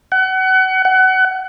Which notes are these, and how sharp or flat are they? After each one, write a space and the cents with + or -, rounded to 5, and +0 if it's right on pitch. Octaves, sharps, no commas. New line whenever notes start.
F#5 +30
F#5 +25